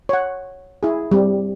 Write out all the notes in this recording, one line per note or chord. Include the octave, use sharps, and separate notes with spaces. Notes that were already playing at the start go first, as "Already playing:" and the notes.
C#5 F#5
E4 G#4
G3 C4